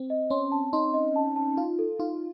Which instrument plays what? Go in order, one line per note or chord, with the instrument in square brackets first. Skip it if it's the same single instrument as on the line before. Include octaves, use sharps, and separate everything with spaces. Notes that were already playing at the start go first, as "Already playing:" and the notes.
Already playing: [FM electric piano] C4
[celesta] D#5
[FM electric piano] C#4 [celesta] C6
[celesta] A5
[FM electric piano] D#4 [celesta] C6
[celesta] D#5
A5
A5
[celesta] D#4 [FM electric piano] F4
[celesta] A4
[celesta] D#4 [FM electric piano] F4